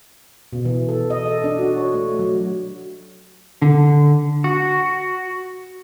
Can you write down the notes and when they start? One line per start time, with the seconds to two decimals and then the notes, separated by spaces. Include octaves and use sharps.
0.53 B2
0.65 E3
0.89 A4
1.10 D#5
1.26 A4
1.44 D4
1.59 F#4
1.77 C#5
1.94 A3
2.19 F#3
3.62 D3
4.44 F#4